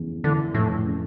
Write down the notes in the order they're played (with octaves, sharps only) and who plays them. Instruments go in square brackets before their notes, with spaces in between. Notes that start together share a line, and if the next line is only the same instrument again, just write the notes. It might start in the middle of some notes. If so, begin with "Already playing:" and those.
Already playing: [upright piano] F1 E2 C#3
[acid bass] D3 [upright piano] E3
[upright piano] F1 [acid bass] A2
[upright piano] C#3